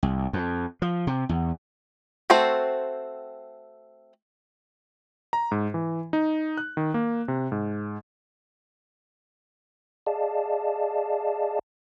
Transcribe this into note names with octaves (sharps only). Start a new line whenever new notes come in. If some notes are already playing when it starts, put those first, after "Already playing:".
C2
F2
F3
C3
E2
A3 C4 F#4 A4 C5
A#5
G#2
E3
D#4
F#6
D#3
A#3
C3
G#2
G#4 D5 D#5 F5 A5